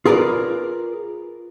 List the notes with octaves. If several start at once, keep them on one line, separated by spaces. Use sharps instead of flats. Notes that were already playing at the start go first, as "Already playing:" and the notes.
F4 G#4 A#4 B4 D5